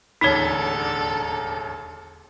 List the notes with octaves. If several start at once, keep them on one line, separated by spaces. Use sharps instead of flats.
E1 A1 D#2 D3 D#4 A4 C#5